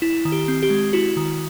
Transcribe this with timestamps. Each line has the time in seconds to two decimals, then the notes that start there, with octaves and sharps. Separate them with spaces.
0.02 E4
0.25 D#3
0.32 G4
0.48 C4
0.63 G4
0.70 G#3
0.93 E4 F#4
1.17 D#3